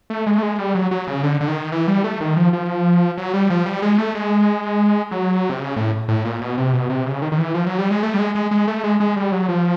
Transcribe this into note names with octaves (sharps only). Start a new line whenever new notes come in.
A3
G#3
A3
G#3
G3
F#3
F#3
C#3
D3
D3
D#3
E3
G3
A3
D#3
F3
F3
F#3
G3
F3
G3
G#3
A3
G#3
F#3
C3
C#3
A2
A2
A#2
B2
C3
B2
C3
C#3
D#3
D#3
E3
F3
F#3
G3
G#3
A3
G3
G#3
G#3
G#3
A3
G#3
G#3
G3
F#3
F3